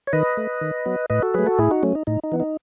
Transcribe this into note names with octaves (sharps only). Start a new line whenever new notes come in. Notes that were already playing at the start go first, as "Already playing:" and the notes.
C#5
D#3 B4 D#5
A3
D#3
F#3 B3
A2 B4 D#5
F#4 A4
F#3 A3 G#4 B4
F#4 A4
A2 E4 G#4
D#4 F#4
F#3 A3 C#4
D#4
A2 D#4
D#4
E3 B3
D#4